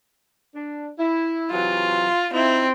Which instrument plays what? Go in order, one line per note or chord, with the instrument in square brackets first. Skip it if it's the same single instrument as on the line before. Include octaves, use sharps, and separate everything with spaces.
[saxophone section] D4
E4
[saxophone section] C3 E3 F#3 [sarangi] F4
[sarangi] C4 [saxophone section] D#4 E4